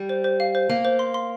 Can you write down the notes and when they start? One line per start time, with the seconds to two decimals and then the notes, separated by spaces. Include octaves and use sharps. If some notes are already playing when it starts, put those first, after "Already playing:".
Already playing: G3
0.09 C5
0.24 C5
0.40 F5
0.55 C5
0.69 A#3 F5
0.85 C5
0.99 C6
1.14 C6